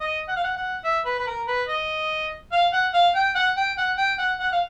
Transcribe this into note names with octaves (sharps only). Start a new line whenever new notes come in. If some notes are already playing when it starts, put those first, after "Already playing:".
D#5
F#5
F5
F#5
F#5
E5
B4
B4
A#4
B4
D#5
F5
F#5
F5
G5
F#5
G5
F#5
G5
F#5
F#5
F5